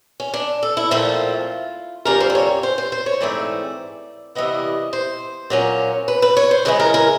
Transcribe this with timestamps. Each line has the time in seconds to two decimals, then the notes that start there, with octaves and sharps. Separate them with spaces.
0.20 C#4
0.34 D4
0.63 A4
0.77 E4
0.91 A#2 F3 A3 C4 F4
2.05 F2 D3 G3 A#3 C#4 A#4
2.20 C5
2.30 D5
2.35 C#5
2.63 C5
2.78 C5
2.92 C5
3.06 C#5
3.21 G#2 E3 A3 C4 D5
4.35 C3 E3 G3 B3 D#5
4.93 C5
5.50 A#2 F#3 A#3 C#4
6.08 B4
6.22 B4
6.37 C#5
6.51 C5
6.65 C#3 E3 G#3 B4
6.80 A#4
6.94 A#4